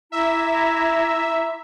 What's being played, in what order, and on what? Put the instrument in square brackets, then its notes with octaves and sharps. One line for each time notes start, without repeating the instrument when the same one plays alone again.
[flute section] E4 A#5 D6 [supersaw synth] E5